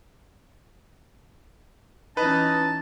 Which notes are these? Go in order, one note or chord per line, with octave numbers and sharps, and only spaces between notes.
E3 C#4 D#4 B4 A5